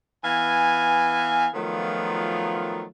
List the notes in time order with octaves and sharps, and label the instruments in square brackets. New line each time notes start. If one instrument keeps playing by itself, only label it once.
[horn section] E3 B3 F5 G#5
D#3 F3 F#3 A3 B3 F4